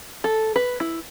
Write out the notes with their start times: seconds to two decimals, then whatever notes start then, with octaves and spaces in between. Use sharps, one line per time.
0.24 A4
0.56 B4
0.80 E4